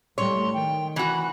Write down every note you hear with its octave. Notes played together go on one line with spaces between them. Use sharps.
A2 G3 A3 C#5 C6
D#3 G5
E3 F#4 B5